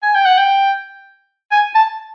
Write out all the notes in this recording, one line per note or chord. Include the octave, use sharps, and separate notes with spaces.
G#5
G5
F#5
G5
G#5
A5